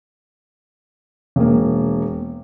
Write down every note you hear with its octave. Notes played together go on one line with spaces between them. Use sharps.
E1 A#3